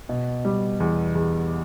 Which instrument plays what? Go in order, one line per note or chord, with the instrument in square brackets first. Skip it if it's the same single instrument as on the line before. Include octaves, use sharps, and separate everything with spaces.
[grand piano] B2
G3
E2
E2